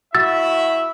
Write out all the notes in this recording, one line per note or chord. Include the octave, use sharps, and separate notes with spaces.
A3 E4 F#4 E5 E6 A6